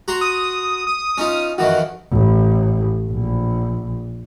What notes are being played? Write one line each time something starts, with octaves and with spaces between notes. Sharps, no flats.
F#4 A#5 C6
D#6
D#6
C#4 D#4 F4
F2 D#3 E3 F#4
A1
A#1